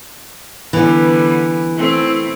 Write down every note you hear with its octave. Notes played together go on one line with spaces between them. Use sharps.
D3 E3 G3 B3
A3 C4 E4